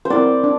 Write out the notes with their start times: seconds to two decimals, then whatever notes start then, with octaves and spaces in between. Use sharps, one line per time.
0.05 C5
0.10 C4 E4 A#4 D5
0.44 D4